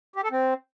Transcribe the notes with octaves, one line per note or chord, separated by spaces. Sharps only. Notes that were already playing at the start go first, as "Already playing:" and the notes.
G4
A4
C4